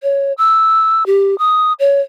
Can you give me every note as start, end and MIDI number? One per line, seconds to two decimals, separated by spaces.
0.03 0.33 73
0.38 1.03 88
1.06 1.38 67
1.38 1.73 87
1.80 2.01 73